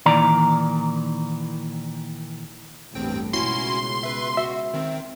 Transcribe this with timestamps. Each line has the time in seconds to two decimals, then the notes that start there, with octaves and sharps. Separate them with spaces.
0.06 A#2 D#3 E3 D5 A#5
2.95 A1 E2 G2 C4 G5
3.33 C#2 B2 C#4 E4 F#4 C6
4.03 B4 E5
4.37 F#4 E5
4.74 D#3 C4